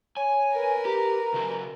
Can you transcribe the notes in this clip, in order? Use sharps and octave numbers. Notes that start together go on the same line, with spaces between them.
C#5 G#5
A#4 B4
G4 A#5
C#3 F#4 G#4